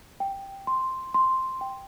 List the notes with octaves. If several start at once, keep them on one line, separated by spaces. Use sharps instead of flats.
G5
C6
C6
G5